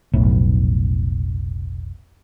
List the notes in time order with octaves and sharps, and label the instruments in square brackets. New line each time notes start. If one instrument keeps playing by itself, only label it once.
[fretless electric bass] F1 B1 A2